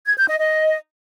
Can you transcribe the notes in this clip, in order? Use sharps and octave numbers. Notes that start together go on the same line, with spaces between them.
G#6
G6
D#5
D#5